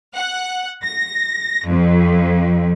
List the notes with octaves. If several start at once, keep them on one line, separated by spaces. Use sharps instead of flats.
F#5
A#6
F2